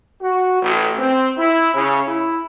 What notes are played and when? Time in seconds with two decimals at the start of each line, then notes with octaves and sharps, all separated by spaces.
0.21 F#4
0.61 A1
0.98 C4
1.38 E4
1.74 C#3
2.07 E4